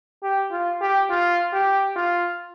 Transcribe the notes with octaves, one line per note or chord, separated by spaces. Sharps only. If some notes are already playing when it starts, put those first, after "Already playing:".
G4
F4
G4
F4
G4
F4